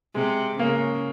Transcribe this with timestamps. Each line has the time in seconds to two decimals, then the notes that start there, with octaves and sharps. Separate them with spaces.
0.14 C3 G#3
0.59 C#3 A#3